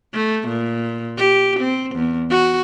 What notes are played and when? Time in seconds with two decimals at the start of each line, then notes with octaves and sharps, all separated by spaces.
0.14 A3
0.48 A#2
1.17 G4
1.60 C4
1.96 E2
2.30 F#4